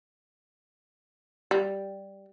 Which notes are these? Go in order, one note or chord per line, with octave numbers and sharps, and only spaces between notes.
G3